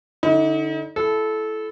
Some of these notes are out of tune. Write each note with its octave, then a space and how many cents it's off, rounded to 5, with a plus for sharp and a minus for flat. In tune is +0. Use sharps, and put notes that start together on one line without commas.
D3 +0 D#4 +40
E4 +15 A4 -20